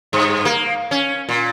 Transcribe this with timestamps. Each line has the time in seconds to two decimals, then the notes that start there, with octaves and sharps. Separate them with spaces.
0.13 G2
0.45 A#3
0.91 C#4
1.29 A#2